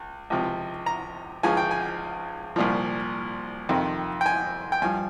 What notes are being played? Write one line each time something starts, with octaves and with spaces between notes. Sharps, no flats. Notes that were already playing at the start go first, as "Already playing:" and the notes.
Already playing: C#2
C#2 C3 F3
A#5
C#2 C#3 F3 G#5
G5
G#5
C2 A#2 F3
F2 C3 D#3
G5
G#5
G5
G2 F3 G#5